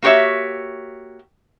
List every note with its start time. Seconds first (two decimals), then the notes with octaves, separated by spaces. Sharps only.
0.02 A#3 F#4 G4 C#5 E5